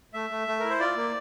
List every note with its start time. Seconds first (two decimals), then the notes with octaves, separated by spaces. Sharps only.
0.14 A3 E5
0.30 A3
0.47 A3
0.60 E4 A#4
0.70 C5
0.80 F4 D5
0.97 A#3